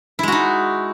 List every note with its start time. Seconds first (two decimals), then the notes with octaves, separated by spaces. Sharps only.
0.19 E4
0.23 G#3
0.28 F#4
0.32 D#4